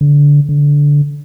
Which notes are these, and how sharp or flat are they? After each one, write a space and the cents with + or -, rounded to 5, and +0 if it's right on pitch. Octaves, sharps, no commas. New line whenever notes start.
D3 -20
D3 -15